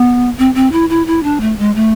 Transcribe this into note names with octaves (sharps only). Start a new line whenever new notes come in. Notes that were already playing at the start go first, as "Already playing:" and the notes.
Already playing: B3
C4
C4
E4
E4
E4
D4
A3
G#3
A3